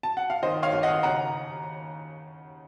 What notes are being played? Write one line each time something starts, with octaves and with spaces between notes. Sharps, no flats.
A5
F#5
F5
D#3 C5 D#5
C#5 F5
D#2
D#5 F#5
C#3 F#5 A#5